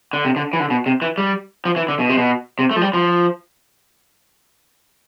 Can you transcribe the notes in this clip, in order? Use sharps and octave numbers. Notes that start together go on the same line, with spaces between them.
D3
C3
D3
E3
D3
B2
C3
E3
G3
F3
E3
D3
B2
C3
B2
C3
A3
F3
G3
F3